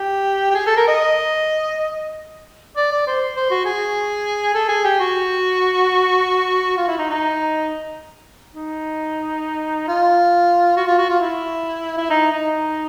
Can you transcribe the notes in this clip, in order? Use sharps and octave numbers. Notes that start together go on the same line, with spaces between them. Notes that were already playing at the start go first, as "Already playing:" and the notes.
Already playing: G4
G4
G#4
A4
A#4
D#5
D5
D5
C5
C5
F#4
G#4
A4
G#4
G4
F#4
F4
E4
D#4
D#4
D#4
F4
F#4
F4
F#4
F4
E4
E4
D#4
D#4